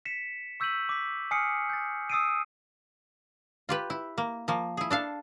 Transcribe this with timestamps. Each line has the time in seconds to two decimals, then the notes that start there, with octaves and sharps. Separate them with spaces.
0.05 B6 C#7 E7
0.60 C#6 E6 G6 B6 D#7 F#7
0.89 D6 B6
1.31 G#5 D#6 F6 C7 C#7
1.69 G6 A6
2.10 D#6 E6 A6 C7 D7 D#7
3.69 F4 G4 B4
3.90 E4
4.18 A#3
4.48 F3 A#3
4.77 E4 G#4
4.91 D4 A4 F5